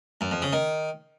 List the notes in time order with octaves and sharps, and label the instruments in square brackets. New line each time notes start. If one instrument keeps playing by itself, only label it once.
[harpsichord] F#2
F2
C#3
D#3